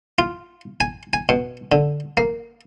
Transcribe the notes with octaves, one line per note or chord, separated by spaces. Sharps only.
F4
G#5
G#5
B2
D3
A#3